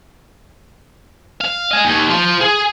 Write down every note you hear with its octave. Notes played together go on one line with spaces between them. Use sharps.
F5
D#5 G#5
D#2
F4 C5
G#4